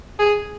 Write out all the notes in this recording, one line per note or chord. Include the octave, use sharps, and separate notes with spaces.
G#4